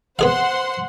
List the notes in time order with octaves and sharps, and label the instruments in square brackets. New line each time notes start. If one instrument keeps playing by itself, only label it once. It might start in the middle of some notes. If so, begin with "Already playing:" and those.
[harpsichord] B3 G#4 F5 [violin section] C5 F#5 C6